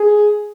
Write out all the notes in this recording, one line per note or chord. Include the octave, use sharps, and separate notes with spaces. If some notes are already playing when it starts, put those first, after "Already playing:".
Already playing: G#4